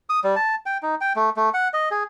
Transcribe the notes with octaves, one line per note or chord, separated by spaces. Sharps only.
D#6
G3
A5
G5
D#4
G5
A3
A3
F#5
D#5
G#4